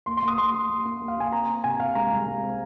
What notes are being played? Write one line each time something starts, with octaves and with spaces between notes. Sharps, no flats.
A#3 C6
C6
A#3
D#6
A#3 C6
A#3
A#3
A#3
A#3
F5
A#3 G#5
C4 A#5
C4
C3 G#5
C3 F5
G#3 A#5
C2
G#3
C4